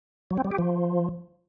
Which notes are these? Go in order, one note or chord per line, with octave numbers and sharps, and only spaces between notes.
F#3
C4
G3
G4
F3